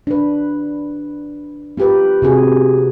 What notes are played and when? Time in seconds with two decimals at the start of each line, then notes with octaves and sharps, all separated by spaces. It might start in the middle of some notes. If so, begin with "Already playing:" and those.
0.07 D4 B4
1.77 B3 F4 G4 A#4 B4
2.22 C3 F#4 G#4